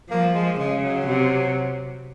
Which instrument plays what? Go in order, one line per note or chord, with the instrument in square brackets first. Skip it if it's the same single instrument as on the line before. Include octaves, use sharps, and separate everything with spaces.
[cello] F3 [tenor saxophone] A#3
[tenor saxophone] G#3
[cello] C#3 [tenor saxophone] G#3
[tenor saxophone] F#3
[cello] C3